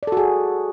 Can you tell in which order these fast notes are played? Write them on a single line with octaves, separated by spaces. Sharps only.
D5 A4 F#4 G#4